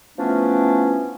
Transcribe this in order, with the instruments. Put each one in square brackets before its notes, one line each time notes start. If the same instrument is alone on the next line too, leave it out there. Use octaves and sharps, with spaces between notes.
[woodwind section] E3 F3 A3 B3 C#4 D4